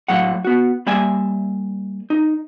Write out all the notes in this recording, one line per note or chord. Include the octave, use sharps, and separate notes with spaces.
A2 F#3 F5 F#5
B3 F#4
G3 A#3 D5 E5 G#5
D#4